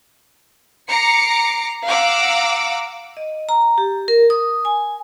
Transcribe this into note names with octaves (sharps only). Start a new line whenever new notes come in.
A#5 D6 C7 C#7
F5 F#5 A#5 D6 E6
D#5
A#5
G4
A#4
D#6
G#5